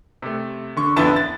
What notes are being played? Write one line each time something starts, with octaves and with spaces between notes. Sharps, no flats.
C3 A3
D3 C#6
A1 F2 D3 B3 E4 A5
A6